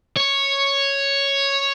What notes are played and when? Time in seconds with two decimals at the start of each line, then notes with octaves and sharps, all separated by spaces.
0.17 C#5